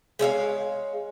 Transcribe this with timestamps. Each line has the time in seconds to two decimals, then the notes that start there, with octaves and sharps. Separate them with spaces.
0.19 G#3 C#5 E5 F5